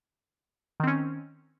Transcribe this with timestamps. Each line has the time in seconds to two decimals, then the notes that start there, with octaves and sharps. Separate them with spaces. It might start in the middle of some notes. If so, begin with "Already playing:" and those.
0.80 D#3
0.84 C4
0.87 C#4